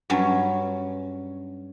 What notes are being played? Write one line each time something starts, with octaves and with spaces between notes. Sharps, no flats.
G2 F#3 C#4